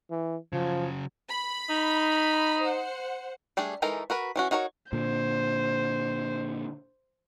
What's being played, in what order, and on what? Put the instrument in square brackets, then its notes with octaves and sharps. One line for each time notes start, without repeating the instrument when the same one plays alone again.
[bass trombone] E3
[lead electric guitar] C#3 F#3 [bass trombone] F3
[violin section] B5
[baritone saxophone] D#4
[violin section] C5 F#5
[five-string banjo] G3 A3 D4 G#4
E3 G#3 D#4 A4 A#4
F#4 A#4 B4
E3 C#4 F#4
D#4 F#4 A#4 B4 C#5
[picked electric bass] A#2 D3 [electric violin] C5